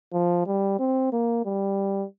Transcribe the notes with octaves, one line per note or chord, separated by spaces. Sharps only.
F3
G3
C4
A#3
G3